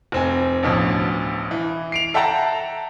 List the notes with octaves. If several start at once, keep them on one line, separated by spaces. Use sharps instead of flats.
F1 C4 G#5
A1 D2 B2 F3
E3
C7 D7 F7
A4 E5 F#5 G5 A5 A#5